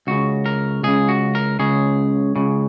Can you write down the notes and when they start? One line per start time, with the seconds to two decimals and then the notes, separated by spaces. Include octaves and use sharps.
0.07 C#2 C#3 F#4
0.46 A#4
0.83 C#2 C#3 G#4
1.09 F#4
1.35 A#4
1.59 C#2 C#3 G#4
2.36 C#2 C#3